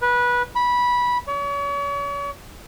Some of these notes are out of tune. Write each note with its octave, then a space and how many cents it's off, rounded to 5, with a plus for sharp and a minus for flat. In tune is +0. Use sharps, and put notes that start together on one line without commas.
B4 -20
B5 -15
C#5 +40